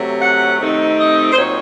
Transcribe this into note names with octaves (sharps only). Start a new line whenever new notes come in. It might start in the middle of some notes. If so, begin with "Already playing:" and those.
Already playing: C3 F#3 A3
F#5
C3 D#3 A3 C4 D#4
D#5
C5
A#2 F#3 C4 D#4 C#5